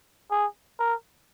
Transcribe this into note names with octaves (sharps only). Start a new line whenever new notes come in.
G#4
A#4